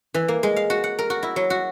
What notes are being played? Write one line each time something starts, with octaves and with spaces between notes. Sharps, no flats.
E3
A#3
G#3
F5
F#4
F#5
A#4
F#4
E4
F#3
F#4